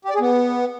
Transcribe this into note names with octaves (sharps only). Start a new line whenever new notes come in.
G4
D5
G#4
B3